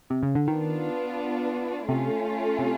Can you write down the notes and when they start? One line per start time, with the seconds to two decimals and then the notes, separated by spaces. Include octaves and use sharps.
0.10 C3
0.23 C#3
0.35 D3
0.48 D#3 B3 D4 F4
1.88 C3 A3 C#4 F4
2.59 C3